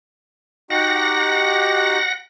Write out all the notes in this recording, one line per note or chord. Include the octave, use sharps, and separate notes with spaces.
D#4 F#4 G4 F#5 A#6